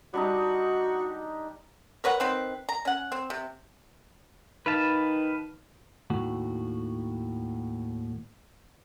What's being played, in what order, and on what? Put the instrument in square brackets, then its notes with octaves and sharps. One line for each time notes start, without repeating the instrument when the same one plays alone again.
[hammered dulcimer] G3 D4 D#4 [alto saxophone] F#4
[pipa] A#4 B4 C#5 F#5
D#3 C4 B4
A#5
C#4 F#5
C4
C3
[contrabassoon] D#3 [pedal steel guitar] B4 F5 A5
[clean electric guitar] D#2 A2 F#4